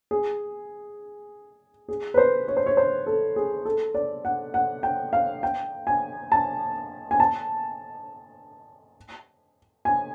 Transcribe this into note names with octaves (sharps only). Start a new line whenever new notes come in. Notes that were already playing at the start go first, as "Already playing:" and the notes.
G#4
G#4
B4
C5
C#5
C5
C#5
C5
A4
G#4
A4
D5
F#5
F#5
G5
F5
G5
G#5
A5
G#5
A5
G#5